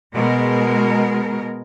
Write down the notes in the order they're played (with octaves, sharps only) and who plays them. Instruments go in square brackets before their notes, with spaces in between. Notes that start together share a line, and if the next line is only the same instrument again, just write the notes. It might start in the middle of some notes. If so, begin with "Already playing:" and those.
[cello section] B2 G#3 A#4